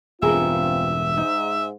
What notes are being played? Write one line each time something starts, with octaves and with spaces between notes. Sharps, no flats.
E1 G2 C4 F4 G#4 A#4 E5
G#2 D#4